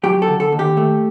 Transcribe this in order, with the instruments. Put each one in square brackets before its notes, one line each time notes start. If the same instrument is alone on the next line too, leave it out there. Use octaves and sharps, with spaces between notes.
[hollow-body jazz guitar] F#3 G4
A4
D3
A4
D#2
G4
A3